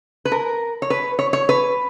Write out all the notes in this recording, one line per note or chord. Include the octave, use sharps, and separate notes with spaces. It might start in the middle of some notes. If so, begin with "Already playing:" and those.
B4
A#4
C#5
B4
C#5
C#5
B4